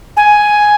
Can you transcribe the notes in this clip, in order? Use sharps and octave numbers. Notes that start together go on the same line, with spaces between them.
G#5